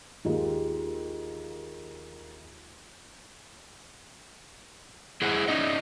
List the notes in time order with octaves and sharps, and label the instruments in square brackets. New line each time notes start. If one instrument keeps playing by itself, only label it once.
[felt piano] D#2 G#3 A#3 [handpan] D#4 F4 G4
[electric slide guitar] E4 G#4 C5 F#5
C#4 D#4 D#5